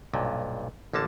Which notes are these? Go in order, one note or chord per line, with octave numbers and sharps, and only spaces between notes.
B1 G2 A#2
A1 D3 A#3 A5